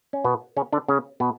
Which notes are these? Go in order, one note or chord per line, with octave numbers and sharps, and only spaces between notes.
C#4
B2 B3
C#3 C#4
D3 D4
C#3 C#4
B2 B3